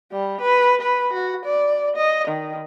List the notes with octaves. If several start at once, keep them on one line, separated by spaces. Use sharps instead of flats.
G3
B4
B4
F#4
D5
D#5
D#3